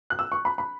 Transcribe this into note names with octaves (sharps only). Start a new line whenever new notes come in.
F#6
E6
C#6
B5
B5